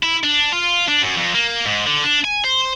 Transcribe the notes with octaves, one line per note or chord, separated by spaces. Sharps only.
E4
D4
F4
D4
F#2
F2
A#3
G#2
D3
D4
G#5
C5